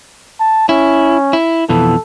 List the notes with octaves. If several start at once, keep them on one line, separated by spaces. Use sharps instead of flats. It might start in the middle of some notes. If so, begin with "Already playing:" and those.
A5
C#4 E4
E4
F2 B2 E3 A4